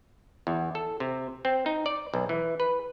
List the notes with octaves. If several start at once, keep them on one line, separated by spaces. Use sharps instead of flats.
E2
A4
C3
C4
D#4
D5
B1
E3
B4